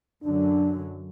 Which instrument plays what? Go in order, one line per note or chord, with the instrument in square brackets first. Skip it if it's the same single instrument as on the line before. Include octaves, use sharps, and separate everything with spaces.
[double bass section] F#2 D3 F#3 [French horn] D4